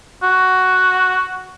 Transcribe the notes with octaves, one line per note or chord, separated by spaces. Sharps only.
F#4